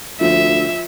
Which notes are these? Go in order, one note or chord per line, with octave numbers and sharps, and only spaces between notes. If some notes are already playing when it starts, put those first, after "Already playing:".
D2 F3 E5